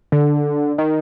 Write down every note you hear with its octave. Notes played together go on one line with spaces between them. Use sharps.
D3
D#3